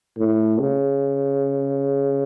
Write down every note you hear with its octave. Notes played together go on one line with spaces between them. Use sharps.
A2
C#3